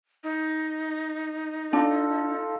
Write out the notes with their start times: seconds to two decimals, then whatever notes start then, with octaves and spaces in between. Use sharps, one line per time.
0.24 D#4
1.73 D4 F4 A4